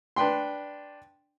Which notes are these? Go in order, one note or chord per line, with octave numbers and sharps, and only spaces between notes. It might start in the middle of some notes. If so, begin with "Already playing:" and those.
D4 B4 G5 C6